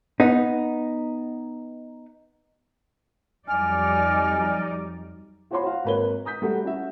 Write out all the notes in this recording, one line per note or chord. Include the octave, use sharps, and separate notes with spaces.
B3 D#4
F2 F#3 G3 D#4 D5 G#5 F6
F4 F#4 C5 C#5 B5 C6
F#4 F5
G#1 A#3 A#4 B4 C#5 G7
A#5 D#6 G6 B6
G3 A3 F#4 A4
C#4 F#4 E5